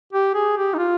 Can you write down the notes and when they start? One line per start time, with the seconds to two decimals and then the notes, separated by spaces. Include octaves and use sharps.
0.13 G4
0.34 G#4
0.57 G4
0.74 D#4
0.78 F4